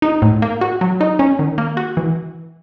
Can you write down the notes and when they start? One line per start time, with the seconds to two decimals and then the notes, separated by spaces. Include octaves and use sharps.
0.02 D#4
0.22 A2
0.42 A#3
0.61 F#4
0.81 F#3
1.01 D#4
1.19 C#4
1.39 D#3
1.58 A#3
1.77 F#4
1.97 E3